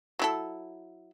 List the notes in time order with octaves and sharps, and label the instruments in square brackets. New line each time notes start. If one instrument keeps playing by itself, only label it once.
[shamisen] F#3 E4 A4